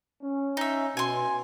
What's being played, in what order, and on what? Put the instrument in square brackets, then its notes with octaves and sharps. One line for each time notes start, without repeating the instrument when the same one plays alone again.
[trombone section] C#4
[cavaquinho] D#4 E5
[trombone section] B2 [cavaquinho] G#5 C6